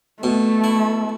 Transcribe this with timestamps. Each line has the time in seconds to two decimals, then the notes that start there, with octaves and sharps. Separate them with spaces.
0.23 B2 A3
0.64 E4